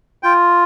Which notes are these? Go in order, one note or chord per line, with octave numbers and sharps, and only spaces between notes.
F4 G5